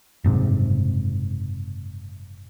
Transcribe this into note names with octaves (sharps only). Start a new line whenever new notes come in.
F#1 G#2 C3